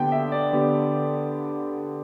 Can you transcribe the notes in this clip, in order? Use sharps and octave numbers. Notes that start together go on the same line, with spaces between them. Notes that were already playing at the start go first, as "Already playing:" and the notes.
Already playing: D3 B3 G4 G5
E5
D5
D3 B3 G4